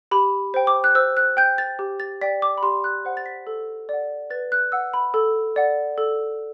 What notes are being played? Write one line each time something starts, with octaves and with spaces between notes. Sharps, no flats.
G4 B5
C5 G5
D6
F#6
C5 E6
F#6
G5 G6
A6
G4
A6
D5 G5 B6
D6
B5
G4 C6
F#6
C5 F#5
A6
B6
A4
D5 F#5
B4 A6
F#6
F#5 E6
B5
A4
D5 F#5
A4